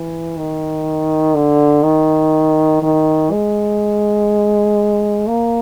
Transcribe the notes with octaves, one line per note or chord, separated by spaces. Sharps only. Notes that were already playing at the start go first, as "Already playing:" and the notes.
Already playing: E3
D#3
D3
D#3
D#3
G#3
A#3